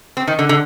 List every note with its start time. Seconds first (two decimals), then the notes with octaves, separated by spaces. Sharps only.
0.17 C4
0.28 D#3
0.39 D3
0.49 D3